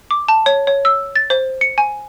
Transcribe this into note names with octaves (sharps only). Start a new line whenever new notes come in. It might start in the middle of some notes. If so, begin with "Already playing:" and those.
D6
A5
C#5
C#5
E6
A6
C5
C#7
G#5